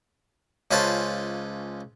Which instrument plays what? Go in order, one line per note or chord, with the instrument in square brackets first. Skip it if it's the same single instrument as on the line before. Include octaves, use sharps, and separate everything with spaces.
[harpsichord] C#2 C#4 F4 B4 C5 A5